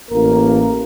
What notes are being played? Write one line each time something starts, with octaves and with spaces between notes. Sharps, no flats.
A1 A#3 A#4